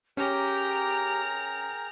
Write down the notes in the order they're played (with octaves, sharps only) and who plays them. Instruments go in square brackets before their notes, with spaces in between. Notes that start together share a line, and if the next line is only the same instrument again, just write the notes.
[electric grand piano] C#4 [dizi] G4 [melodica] G#4 A#4 G5 [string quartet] A#5